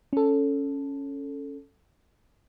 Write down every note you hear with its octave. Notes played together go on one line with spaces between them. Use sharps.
C#4 A4